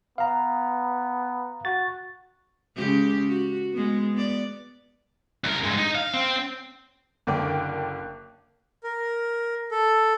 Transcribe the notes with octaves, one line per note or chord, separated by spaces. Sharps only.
B3 F5 A#5
F#4 A6
C#3 G#3 G4
F#4
G#3 B3
B3 D5
C2 A#4
G2 G#3
D#4
F5
C4
F#1 D3 A#4 G5 D6
A#4
A4